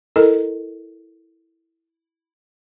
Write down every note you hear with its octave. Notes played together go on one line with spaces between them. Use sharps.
E4 A4 A#4 D#5